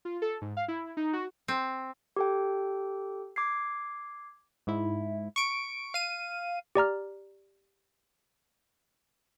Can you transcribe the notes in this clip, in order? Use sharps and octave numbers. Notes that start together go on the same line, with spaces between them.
F4
A4
G#2
F5
E4
D#4
F#4
C4
G4 A4 G5
D6 G#6 C7
G#2 E4
C#6 D7
F5 D#7
G4 D5 A#5 F6